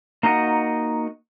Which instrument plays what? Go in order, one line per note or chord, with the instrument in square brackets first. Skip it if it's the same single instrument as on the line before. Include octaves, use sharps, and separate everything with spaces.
[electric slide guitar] A#3 D#4 F#4 D#5 F#5